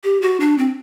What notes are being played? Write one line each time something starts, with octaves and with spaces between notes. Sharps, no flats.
G4
F#4
D4
C4